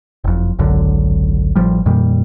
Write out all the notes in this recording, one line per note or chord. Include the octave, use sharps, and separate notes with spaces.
F#1 F2
G#1 C#2 F#2 D3
A1 F3 G3
F2 A#2 D#3 G3